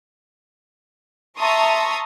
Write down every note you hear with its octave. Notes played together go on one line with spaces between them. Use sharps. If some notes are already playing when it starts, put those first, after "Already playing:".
E5 A5 A#5 C6 C#6 D#6